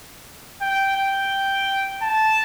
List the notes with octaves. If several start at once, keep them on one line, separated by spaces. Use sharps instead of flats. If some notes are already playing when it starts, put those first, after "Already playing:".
G5
G5
A5